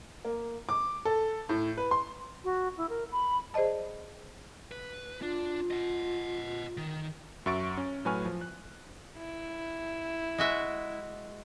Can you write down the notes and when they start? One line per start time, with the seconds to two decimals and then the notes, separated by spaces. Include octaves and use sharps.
0.25 A#3
0.69 D6
1.05 A4
1.49 A2
1.77 B4
1.91 C6
2.44 F#4
2.77 E4
2.89 A#4
3.12 B5
3.54 G#4 C5 D5 D#5 A5
4.72 B4
5.22 D4 F4 D5
5.71 D#5 F#5
6.77 D#3
7.46 F#2 F#4 E5 C#6 A6 D7
7.77 C#4
8.05 A2 F#3 B4 G#5 C#6 F6
8.25 F3
8.41 F#6
9.17 E4
10.38 G#3 F#4 E5